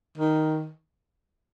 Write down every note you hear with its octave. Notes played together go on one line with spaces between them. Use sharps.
D#3